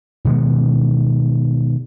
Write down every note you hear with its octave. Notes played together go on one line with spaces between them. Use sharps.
B2 D#3 G#3 B3